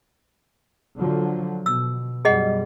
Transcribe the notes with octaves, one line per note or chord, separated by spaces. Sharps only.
D3 F3 F#3
B2 E6
F#2 B2 G3 G#4 D#5 F#5